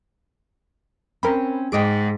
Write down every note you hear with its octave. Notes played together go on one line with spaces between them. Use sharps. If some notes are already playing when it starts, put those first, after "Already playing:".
C4 C#4 A#4 C5 B5
G#2 G#4 D#5 F#5 G5 D6 D7